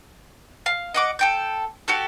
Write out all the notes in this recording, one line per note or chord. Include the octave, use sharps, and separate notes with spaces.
F5
D#5 F#5 D6
A4 G5 G6
F#4 G4 A4